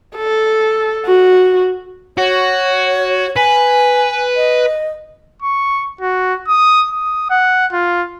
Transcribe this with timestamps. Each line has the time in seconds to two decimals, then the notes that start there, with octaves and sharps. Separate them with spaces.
0.17 A4
1.06 F#4
2.17 F#4 C#5
3.36 B4 G#5
4.36 D#5
5.42 C#6
6.01 F#4
6.48 D#6
6.91 D#6
7.30 F#5
7.72 F4